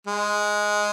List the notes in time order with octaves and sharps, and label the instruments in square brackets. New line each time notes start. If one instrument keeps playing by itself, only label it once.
[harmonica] G#3